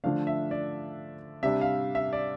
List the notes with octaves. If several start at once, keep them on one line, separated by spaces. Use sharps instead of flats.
D3 F3 A3 D4 F5
E5
D5
C3 G3 D4 E5
F5
E5
D5